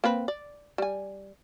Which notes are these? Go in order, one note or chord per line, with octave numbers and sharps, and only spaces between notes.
A#3 C4 B4
D5
G3 G#5